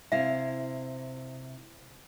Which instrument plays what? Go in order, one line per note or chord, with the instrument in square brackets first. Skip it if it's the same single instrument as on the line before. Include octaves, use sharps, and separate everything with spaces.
[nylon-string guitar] C3 E4 F5 [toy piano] E5